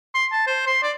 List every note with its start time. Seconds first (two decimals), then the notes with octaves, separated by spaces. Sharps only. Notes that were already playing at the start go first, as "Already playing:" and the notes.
0.15 C6
0.32 A5
0.47 C5
0.67 C6
0.83 D5